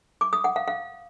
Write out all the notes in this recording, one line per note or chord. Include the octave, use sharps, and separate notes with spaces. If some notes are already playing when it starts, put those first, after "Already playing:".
D6
D#6
F#5
F5
F5